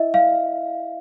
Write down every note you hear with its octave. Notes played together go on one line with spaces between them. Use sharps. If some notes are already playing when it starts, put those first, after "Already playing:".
Already playing: E4 D#5 E5
F5